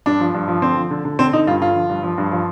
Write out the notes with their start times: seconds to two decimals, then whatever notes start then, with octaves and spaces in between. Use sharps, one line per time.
0.06 G2 D4
0.20 F3
0.34 G2
0.48 F3
0.62 D3 C4
0.76 F3
0.91 D3
1.05 D3
1.19 D3 C4
1.33 D3 D#4
1.47 G2 F4
1.61 D3 F4
1.75 F3
1.89 G2
2.03 F3
2.18 G2
2.32 F3